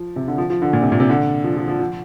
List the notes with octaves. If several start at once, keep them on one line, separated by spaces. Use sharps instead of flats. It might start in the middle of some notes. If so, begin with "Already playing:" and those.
Already playing: F3
C3
D3
F3
F3
D3
A#2
C3
A#2
C3
D3
F3
F3
F3
F3